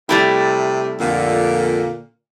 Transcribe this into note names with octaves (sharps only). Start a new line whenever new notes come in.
C3 G3 A3 E4
F2 A#2 D3